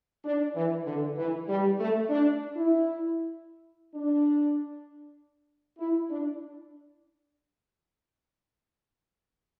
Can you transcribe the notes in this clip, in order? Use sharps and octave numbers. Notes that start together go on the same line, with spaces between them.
D4
E3
D3
E3
G3
A3
D4
E4
D4
E4
D4